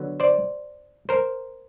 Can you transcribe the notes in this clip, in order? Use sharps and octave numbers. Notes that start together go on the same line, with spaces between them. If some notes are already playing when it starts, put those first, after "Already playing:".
Already playing: D3 F#3 B3
C5 D5
A#4 C5